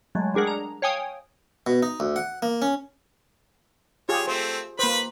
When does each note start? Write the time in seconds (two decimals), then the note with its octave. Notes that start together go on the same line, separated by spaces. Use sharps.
0.15 F#3 G#3 A3
0.34 G3 D4 G#4 A#4 F#5
0.47 A#5
0.82 C#5 F5 G5 G#5 D#6
1.67 B2
1.83 D#4
2.00 D2
2.16 F#5
2.42 A#3
2.62 C#4
4.09 F4 G4 G#4 C#5
4.27 A3 C4 C5
4.79 A#3 B4 C5 B5